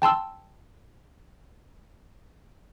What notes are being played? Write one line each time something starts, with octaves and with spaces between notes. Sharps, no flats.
G5 A5 C6 E6